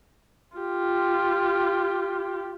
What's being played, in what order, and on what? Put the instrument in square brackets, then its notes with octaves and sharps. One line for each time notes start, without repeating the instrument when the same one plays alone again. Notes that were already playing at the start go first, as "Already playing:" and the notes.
[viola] F4 G4